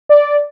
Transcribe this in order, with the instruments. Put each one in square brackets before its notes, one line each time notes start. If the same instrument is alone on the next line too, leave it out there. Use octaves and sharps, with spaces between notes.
[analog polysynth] D5